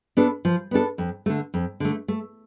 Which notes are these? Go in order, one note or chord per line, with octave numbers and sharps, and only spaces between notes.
B3 D4 A4
F3
B3 D4 A4
F2
D3 A3
F2
D3 A3
A3